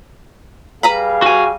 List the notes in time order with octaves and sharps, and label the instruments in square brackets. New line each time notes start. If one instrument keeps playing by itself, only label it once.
[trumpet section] G3 G#4 F5 [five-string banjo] B4 A#5 B5
[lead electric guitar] F#4 G#5